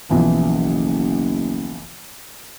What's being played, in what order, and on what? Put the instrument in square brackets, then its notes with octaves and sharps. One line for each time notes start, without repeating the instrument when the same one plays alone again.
[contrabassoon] F#1 [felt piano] B1 E3 F3